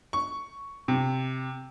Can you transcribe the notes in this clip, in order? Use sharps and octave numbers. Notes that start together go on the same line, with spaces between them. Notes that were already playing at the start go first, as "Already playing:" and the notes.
C#6
C3